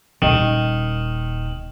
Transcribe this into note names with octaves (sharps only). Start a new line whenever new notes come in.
D#1 D#3